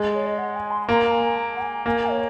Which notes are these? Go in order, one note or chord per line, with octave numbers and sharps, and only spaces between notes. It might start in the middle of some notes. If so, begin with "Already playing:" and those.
Already playing: G#3
C#5
D#5
F#5
G#5
C6
C6
A#3 A#5
G#5
A#5
F#5
G#5
A#3 G#5
C#5